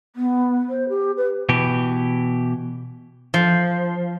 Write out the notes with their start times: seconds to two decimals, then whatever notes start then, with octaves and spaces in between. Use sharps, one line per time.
0.16 B3
0.69 C5
0.89 G4
1.17 B4
1.49 B2 E3 G4
3.34 F3